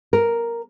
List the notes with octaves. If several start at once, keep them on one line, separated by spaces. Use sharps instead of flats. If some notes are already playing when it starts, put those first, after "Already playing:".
A#4